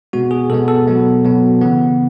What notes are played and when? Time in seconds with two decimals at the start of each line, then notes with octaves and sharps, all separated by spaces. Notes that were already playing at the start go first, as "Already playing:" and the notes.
0.13 B2 G#3 B3 F#4
0.31 G#4
0.50 B2 G#3 B3 A4
0.68 A4
0.88 B2 F#3 B3
1.25 B2 F#3 B3
1.61 C#3 E3 B3